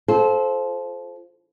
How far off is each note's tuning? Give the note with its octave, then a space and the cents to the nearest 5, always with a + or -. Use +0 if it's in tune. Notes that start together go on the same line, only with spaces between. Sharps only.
F4 +0 A4 -25 C5 +0